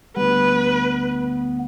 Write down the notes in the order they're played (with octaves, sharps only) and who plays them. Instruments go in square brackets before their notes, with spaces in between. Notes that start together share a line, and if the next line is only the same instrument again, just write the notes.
[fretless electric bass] D2 G3 [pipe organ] B3 [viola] B4